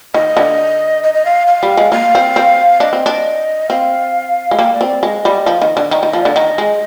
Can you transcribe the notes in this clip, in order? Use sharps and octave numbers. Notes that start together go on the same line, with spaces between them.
D#3 D#5
D3
D#5
D#5
F5
F5
G3
G#3
A#3 F5
C4
C4
D4 D#5
C4
D4
C4 F5
G#3
A#3 G5
D5
C4
D5
G#3 D#5
G3
F3
D#3
D3
D#3
D#3 D#5
F3
D3 D5
D#3 D#5
G#3